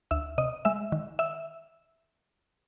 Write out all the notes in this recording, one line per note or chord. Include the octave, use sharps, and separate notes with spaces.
D2 E5 E6
C3 D#5 D#6
G#3 E5 E6
D#3
E5 E6